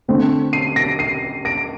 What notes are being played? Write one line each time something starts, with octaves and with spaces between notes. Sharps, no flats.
D3 A3 C4
C7 D#7
A#6 D7
C7 D#7
A#6 D7